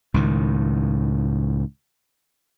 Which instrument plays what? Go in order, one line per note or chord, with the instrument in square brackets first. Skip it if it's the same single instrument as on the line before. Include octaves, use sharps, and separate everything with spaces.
[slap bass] C#2 A2 D#3